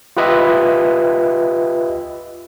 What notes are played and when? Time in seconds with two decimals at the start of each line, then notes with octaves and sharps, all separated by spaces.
0.17 F4 G4 B4 D#5 E5